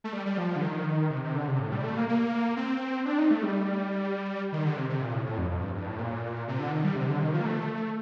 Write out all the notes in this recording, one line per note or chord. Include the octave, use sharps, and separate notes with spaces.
A3
G3
G3
F3
D3
D#3
C3
C3
D3
C3
A2
G3
A3
A#3
A#3
C4
D4
D#4
A3
G3
D#3
D3
C3
C3
A#2
A2
A2
F2
F2
G2
G2
A2
A#2
C3
D3
D#3
G3
C3
D3
D#3
F3
A#3
A3